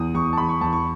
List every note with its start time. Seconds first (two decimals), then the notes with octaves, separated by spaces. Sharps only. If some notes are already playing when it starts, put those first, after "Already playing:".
Already playing: E2 D#6
0.14 E2 C#6
0.33 A5
0.37 E2 B5
0.49 C#6
0.61 E2 A5
0.73 C#6